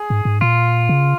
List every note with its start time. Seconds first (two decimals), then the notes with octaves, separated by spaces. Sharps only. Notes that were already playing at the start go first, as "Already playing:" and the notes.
Already playing: G#4
0.10 G#2
0.25 G#2
0.41 A#2 F4
0.89 C#3